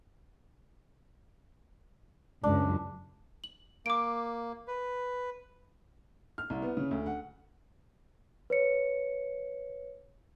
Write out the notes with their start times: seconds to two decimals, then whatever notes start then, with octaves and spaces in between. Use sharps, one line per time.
2.44 C#2 F#2 D4
3.44 F#7
3.86 A#3 D6 D7
4.68 B4
6.38 F6
6.50 C2
6.62 B3
6.77 C#3
6.91 D2
7.06 F#5
8.50 B4 C#5 C#7